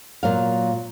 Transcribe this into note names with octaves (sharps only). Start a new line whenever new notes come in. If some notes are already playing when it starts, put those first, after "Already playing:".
A#2 F#3 F5